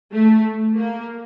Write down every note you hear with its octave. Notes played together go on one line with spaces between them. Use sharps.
A3
A#3